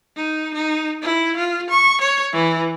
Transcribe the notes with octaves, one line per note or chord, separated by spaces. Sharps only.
D#4
D#4
E4
F4
C#6
C#5
E3